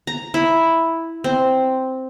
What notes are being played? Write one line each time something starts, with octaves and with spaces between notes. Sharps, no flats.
A#5
E4
C4